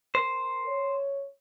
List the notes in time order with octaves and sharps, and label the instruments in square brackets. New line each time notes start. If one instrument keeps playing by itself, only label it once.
[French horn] A#4 [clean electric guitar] C5
[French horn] C#5